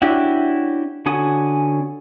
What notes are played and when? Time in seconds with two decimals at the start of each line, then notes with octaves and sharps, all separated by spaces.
0.02 C#4 D4 E4 F#4 G4
1.06 D3 C#4 F#4 G#5 D#6